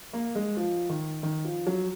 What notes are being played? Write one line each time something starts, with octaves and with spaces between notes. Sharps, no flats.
A#3
G#3
F3
D#3
D#3
F3
F#3